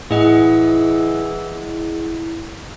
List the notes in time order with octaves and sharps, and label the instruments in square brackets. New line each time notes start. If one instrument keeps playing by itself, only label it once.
[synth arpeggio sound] A2 [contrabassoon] E3 [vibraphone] E4 [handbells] G#4 D#5 F#5